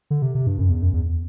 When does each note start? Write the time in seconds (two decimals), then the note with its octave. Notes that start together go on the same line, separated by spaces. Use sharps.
0.10 D3
0.22 C3
0.35 C3
0.47 G2
0.58 F#2
0.70 E2
0.82 F#2
0.93 E2